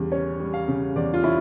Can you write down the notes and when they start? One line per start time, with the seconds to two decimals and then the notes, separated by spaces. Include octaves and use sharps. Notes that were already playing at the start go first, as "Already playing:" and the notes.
Already playing: E2 C#3 G3
0.12 C#4 C#5
0.40 G3
0.54 F5
0.68 C#3
0.96 E2 D5
1.14 F4
1.24 C#4 E4